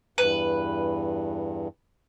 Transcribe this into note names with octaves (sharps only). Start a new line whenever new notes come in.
E2 G2 B4